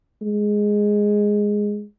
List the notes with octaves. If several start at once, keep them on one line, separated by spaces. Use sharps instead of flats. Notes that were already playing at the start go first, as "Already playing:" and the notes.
G#3